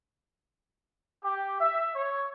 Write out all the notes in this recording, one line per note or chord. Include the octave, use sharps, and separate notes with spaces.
G4
E5
C#5